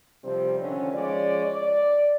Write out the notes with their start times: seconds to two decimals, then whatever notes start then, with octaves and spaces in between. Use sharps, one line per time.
0.24 C3 F3 G3 C4
0.59 D3 D#3 F3 C#4
0.93 F3 G#3 C#4 D5
1.46 D5